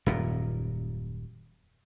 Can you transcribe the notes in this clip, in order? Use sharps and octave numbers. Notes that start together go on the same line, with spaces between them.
D#1 F#2 A#2